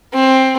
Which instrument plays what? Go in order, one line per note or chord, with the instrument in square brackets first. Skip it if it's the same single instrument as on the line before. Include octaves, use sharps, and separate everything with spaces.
[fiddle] C4